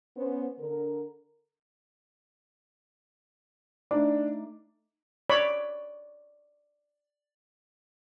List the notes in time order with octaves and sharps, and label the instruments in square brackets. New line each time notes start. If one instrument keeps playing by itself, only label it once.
[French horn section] B3 C#4 C5
D3 A#4
[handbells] A3 D#4 D6 [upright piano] D4
[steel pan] C#5 D5 B5